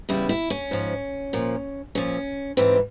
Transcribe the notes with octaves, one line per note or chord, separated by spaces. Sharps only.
E2 C#3 G3 E4
E4
C#4
G#2 F3
A#2 F3
A#2 F3 C#4
G#2 E3 G3 C4